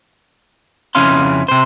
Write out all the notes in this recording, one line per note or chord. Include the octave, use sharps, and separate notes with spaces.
F2 C#3 C#4 E4 F5 C6
C3 C5